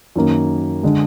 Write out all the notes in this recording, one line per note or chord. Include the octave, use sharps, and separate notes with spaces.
F#2 D#3 A#3
D3 G#3